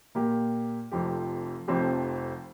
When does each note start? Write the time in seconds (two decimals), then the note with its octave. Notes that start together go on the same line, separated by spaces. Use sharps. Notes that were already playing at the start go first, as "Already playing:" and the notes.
0.15 A#2 A#3 G4
0.91 F1 F2 F3 C4 G4
1.68 F1 F2 F3 C4 G4